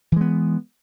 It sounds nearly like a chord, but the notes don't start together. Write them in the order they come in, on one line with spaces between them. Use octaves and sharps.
E3 G#3 B3